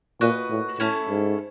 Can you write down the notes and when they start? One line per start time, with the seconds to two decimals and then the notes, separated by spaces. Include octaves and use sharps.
0.21 A#2 F#4 B4 D#5
0.50 A2
0.79 A2 A3 C#4 E4 A4
1.09 G#2